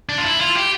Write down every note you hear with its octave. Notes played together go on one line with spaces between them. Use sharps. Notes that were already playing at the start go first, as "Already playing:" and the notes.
D4
F4
E4
F4
G4